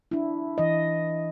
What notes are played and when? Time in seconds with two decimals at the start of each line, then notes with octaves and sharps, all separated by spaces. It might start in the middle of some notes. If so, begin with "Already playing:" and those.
0.11 D4 E4
0.58 E3 D#5